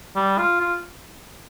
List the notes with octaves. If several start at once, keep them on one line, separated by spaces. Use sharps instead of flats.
G3
F4
F4